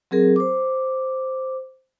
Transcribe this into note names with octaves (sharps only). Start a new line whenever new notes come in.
F#3 C4 G#4 A#4
C5 D6